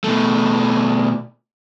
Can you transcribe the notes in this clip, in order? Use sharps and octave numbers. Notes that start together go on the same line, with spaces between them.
B2 A3